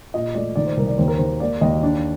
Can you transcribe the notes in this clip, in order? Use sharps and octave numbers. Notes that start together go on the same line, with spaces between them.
A#2 D#5
A3 D5
D#3 D5
C5
C2 A#4
D5
D#2 C5
A#4
D#3 C5
A#3 D5
D#2 D#5
D4